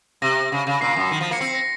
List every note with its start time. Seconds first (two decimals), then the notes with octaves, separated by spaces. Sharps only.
0.22 C3 A#6
0.52 C#3
0.67 C#3
0.81 A#2 C7
0.96 F#2
1.11 D#3
1.21 F3
1.31 A#3 C#7
1.40 C4 C7
1.55 A#6